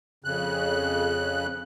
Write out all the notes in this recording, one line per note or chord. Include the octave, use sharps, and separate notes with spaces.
F2 C#3 F#6